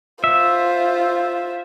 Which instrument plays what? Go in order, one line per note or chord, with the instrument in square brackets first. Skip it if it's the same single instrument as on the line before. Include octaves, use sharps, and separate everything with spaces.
[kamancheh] F4 C5 [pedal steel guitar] E5